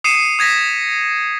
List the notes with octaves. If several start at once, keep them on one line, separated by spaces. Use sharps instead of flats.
D#6 C7 C#7 D#7 E7
D#6 G#6 A#6 B6